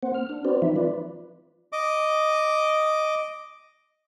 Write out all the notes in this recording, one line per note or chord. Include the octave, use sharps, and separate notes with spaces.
A#3 C4 C5 F#5
F6
D4
C4 F#4 B4 C5 D5
E3 F3 C4 D#4 E5
F4 B4 D5
D#5 D6